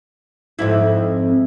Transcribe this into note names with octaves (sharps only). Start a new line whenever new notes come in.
F2 G#2 E4